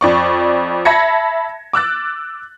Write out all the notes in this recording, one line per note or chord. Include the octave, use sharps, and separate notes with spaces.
F2 D5 C#6
E5 A5 B5 G#6 A#6 C#7
D6 E6 F#6 A6